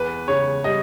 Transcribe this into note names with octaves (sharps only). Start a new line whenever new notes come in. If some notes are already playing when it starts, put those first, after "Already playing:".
Already playing: E2 B4
C#3 C#5
G3 D#5